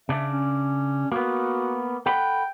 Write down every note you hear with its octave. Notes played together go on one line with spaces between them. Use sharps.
C#3 D4 E5
C#4
A#3 B3 F#4
A4 F#5 G5 B5